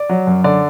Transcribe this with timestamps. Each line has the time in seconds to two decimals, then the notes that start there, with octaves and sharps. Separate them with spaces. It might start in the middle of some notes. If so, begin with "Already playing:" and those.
Already playing: D5
0.09 F#3
0.27 F#2
0.44 D3 D5